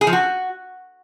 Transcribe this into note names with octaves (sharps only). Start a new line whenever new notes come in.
G#4
F3
F#4